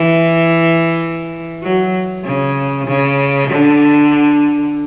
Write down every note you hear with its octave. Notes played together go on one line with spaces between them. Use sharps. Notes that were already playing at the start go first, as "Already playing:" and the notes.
Already playing: E3
F#3
C#3
C#3
D3